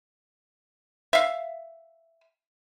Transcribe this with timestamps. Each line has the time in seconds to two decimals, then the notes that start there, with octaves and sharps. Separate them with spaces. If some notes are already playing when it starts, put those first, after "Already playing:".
1.13 E5 F5